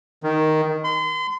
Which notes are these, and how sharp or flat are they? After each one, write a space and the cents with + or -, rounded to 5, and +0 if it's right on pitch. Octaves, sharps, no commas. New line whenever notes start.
D#3 +5
C6 -35